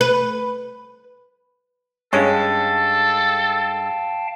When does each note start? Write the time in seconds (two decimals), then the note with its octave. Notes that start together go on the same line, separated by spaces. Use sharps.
0.01 B4
2.13 G2 G#3 C#4 A4 F5 G5 A5